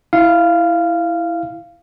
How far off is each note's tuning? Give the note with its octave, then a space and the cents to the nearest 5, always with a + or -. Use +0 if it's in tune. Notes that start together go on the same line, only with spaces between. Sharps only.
E4 +0 F5 -10